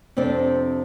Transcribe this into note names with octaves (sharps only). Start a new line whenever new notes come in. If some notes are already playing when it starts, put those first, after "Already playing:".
F2 C3 C4 D4 A4